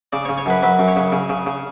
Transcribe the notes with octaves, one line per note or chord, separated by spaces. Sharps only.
C#3 D5
C#5
C#3
C#5
F#2 B4
F#3 B4
F#2
C#5
C#3
C#3
C#3
C#3